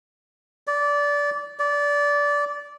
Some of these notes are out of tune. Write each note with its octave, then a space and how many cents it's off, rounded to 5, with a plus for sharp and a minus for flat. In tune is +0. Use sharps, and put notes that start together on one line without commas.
D5 -20
D5 -20